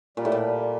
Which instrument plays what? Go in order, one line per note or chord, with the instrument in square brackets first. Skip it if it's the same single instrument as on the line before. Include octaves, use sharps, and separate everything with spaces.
[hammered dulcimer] A#2 [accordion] G3
[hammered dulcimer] A2
A#2
[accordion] G3